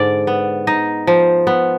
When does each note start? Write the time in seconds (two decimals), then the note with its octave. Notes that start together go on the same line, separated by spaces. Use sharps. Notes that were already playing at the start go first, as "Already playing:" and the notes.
Already playing: G#2 D3 D5
0.27 B3
0.67 D#4 D#5
1.07 F3
1.47 B3